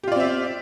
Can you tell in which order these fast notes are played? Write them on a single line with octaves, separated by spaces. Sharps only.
G4 F4 D5 C4 E5